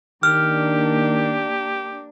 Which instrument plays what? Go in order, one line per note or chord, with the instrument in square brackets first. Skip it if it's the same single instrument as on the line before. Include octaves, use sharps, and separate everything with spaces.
[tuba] D#3 [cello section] A#3 D4 [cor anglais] G4 [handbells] F6